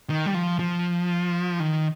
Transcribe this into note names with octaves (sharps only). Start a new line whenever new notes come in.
D#3
G3
F3
F3
D#3